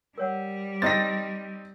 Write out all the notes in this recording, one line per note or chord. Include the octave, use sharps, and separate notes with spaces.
G3 A#4 C#5 F#5
C4 D#4 A6 A#6